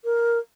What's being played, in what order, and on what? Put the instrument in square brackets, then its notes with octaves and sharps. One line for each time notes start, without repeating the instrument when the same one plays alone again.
[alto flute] A#4